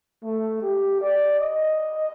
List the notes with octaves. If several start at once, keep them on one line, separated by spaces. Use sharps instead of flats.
A3
G4
D5
D#5